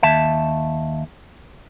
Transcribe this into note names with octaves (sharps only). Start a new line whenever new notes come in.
D#2 E5 A5